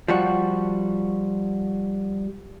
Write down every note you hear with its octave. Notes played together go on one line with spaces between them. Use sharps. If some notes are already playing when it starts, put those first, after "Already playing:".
F3 G3 F#4